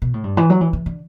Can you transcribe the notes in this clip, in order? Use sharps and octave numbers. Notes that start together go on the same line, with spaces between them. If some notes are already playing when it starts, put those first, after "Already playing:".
B2
A2
G2
E3
F#3
E3
E3
D3